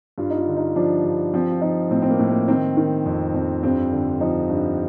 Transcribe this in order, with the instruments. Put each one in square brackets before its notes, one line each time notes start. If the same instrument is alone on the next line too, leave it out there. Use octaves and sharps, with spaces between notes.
[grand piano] G2 F4
D#4
F4
D3
D#4
F3 D4
G2
F3 C4
F4
F3 D#4
A2 C4
C4
A#3
A2
A#3
D#3 C4
D#3
F2
F2
G2 C4
D3
F3 D#4
G2